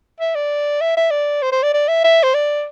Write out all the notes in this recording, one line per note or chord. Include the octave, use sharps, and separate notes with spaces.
E5
D5
E5
E5
D5
C5
C5
D5
D5
E5
E5
C5
D5